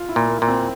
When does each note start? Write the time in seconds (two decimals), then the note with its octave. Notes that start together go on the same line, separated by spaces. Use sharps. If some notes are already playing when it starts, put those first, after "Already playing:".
Already playing: F4
0.09 E4
0.16 A#2
0.28 A#3
0.42 A#2
0.48 C4